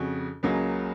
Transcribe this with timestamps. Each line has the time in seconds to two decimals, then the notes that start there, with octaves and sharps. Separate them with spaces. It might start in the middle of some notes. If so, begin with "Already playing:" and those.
Already playing: F2 C#3 C#4 F#4
0.43 C#2 C#3 F#3 A#3